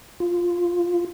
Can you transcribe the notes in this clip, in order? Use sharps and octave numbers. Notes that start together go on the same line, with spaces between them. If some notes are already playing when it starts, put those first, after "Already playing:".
F4